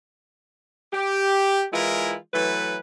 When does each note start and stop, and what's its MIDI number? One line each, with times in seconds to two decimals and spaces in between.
0.92 1.64 67
1.72 2.15 52
1.72 2.15 56
1.72 2.15 64
1.72 2.15 65
1.72 2.15 70
2.33 2.77 52
2.33 2.77 54
2.33 2.77 57
2.33 2.77 71